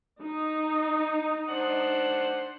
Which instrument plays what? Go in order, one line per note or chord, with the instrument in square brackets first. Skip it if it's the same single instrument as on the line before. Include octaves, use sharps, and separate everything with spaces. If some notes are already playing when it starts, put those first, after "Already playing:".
[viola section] D#4
[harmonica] D4 C5 F#5